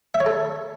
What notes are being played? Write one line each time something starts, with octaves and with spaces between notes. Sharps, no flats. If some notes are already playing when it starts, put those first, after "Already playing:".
E5
C#5
A4